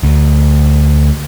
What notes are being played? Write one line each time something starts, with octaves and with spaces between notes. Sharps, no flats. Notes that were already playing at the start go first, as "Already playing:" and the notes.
D2